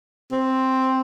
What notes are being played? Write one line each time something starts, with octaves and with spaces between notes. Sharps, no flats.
C4